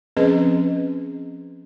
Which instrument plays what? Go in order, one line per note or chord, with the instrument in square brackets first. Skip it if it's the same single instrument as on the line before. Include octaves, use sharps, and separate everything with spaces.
[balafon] F3 C4 C#4 G#4 B4 D#5